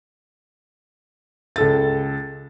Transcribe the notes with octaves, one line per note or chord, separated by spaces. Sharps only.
C#2 A4 A6